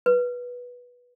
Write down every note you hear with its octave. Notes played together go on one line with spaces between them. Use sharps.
B4